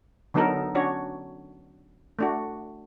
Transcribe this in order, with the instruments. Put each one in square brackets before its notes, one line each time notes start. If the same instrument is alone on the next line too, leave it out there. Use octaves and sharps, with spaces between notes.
[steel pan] D3 F#3 B3 D#4 A4 A#4
C#4 D4 F#4 C#5
A3 D4 F#4